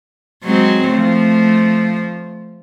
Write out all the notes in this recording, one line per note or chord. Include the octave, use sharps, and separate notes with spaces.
F#3 G#3 C4
F3 A3